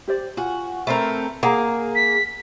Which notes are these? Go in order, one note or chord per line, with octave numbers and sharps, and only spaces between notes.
G4 C5 D5
F4 F#4 G#5
A3 C4 A#4 B4
A#3 G#4 F#5 A#5
B6